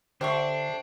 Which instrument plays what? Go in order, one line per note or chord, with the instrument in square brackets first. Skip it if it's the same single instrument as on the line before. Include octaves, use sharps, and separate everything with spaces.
[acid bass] D3 [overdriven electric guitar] D4 [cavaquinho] G4 E5 C#6 [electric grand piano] C5